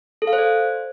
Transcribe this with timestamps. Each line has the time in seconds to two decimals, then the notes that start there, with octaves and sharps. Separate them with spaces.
0.22 A4
0.27 F5
0.33 C5
0.38 D5